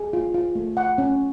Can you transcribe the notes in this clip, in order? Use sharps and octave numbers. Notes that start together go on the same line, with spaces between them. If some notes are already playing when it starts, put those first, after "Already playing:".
Already playing: G#4
F4
F4
A3
F#5
C#4